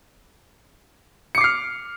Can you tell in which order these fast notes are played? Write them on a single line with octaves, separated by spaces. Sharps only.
C#7 D6 C7 F6